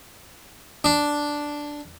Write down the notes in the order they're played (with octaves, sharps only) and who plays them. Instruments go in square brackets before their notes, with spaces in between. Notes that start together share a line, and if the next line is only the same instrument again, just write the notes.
[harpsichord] D4